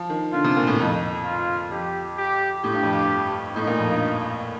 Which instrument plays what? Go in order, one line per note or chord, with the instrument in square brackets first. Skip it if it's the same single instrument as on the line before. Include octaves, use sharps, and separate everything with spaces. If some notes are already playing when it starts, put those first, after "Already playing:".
Already playing: [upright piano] F3
D#3
[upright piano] D3 [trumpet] F4
[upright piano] C3
A#2
A2
[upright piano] F2 [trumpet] D#4
[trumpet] F4
[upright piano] F2 [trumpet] G4
[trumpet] G4
[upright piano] A2 [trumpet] G4
[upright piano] G2
F2
G2
[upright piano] A2 [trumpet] D#4
[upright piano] A#2
F2
G2